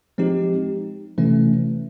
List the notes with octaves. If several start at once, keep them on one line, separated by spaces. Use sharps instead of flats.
F3 G#3 C4 D#4 G4
C3 E3 A3 C#4